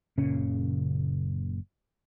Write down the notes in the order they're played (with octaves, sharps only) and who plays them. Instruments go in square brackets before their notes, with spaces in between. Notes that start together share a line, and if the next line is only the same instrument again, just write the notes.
[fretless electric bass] F#1 A#2 C#3 C#4